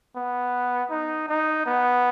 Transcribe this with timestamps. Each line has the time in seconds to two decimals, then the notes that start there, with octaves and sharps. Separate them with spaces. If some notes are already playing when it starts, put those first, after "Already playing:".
0.16 B3
0.90 D#4
1.28 D#4
1.66 B3